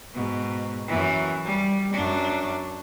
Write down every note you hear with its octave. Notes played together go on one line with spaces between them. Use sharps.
G#2 B2
F#2 E3
G3
F#2 D4